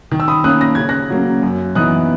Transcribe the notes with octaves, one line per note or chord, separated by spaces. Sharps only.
D#3
E6
B5 D#6
A#3 C#4 D#6 F#6
A#6
C#3 G#6
F#6 A#6
F#3 A#3 C#4
F#2
E3 B3 D#4 D#6 F#6